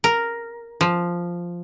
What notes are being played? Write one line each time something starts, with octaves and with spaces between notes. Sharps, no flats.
A#4
F3